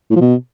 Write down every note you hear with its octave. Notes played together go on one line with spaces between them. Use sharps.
A2
F3
B2